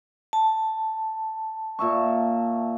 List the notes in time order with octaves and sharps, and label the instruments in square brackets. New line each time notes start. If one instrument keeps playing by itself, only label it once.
[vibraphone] A5
[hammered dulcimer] A#2 E5 C#6